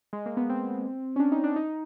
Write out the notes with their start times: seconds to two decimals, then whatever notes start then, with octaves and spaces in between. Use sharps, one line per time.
0.13 G#3
0.26 A#3
0.37 B3
0.49 C4
1.16 C#4
1.20 D4
1.32 D#4
1.44 D4
1.56 D#4